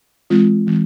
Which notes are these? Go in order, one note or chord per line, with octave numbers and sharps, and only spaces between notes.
E3 G#3 C4 F4
E3 G#3 C4